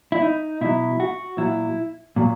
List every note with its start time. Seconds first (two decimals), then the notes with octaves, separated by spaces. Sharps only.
0.12 E4
0.22 D#4
0.61 B2 F#3 E4
1.00 F#4
1.38 A#2 F#3 E4
2.16 A#2 F#3